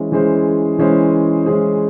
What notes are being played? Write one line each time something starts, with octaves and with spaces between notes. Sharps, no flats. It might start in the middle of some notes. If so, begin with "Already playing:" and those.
Already playing: E3 G#3 C#4 G#4 C5
E3 G#3 C#4 G#4 C5
E3 G#3 C#4 G#4 C5
E3 G#3 C#4 G#4 C5